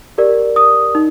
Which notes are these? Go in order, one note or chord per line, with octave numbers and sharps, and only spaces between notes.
G4 A#4 D5
D#6
D#4